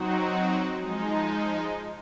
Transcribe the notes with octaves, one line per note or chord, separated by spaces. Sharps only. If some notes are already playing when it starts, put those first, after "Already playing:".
Already playing: F#3 C4 D#4 F#4
F3 G#3 D#4